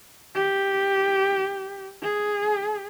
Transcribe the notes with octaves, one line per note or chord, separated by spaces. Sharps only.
G4
G#4